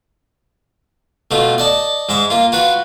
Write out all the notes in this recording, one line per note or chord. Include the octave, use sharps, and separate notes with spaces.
B2 A3 F4
D5 D#5 A5
G#2 G#3 E5 D6
A#3 F4
F4 F#4 B4 F5